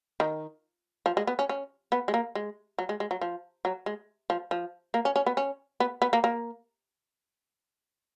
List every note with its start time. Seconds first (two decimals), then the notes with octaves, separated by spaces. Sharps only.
0.20 D#3
1.06 F3
1.17 G#3
1.27 B3
1.39 C#4
1.49 C#4
1.92 B3
2.08 G#3
2.14 A#3
2.35 G#3
2.79 F#3
2.89 G#3
3.00 G#3
3.11 F#3
3.21 F3
3.65 F#3
3.86 G#3
4.30 F3
4.51 F3
4.94 A#3
5.05 C#4
5.16 C#4
5.26 B3
5.37 C#4
5.80 B3
6.02 B3
6.13 A#3
6.24 A#3